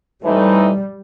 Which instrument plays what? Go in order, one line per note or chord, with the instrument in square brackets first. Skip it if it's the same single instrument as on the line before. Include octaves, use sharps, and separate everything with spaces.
[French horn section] A2 E3 A3 C4 D#4 [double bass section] G3